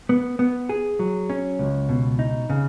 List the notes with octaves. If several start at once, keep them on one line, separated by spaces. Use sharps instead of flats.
B3
B3
G#4
F#3
C#4
C#2
B2
D#4
C#3